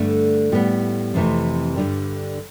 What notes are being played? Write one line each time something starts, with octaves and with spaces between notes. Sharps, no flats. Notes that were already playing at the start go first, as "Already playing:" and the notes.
Already playing: G2 D3 A3
A2 G3 B3
F2 C3 E3 A3
G2 D3 G3